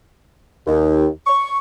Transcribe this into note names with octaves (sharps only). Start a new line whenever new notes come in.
D#2
C#6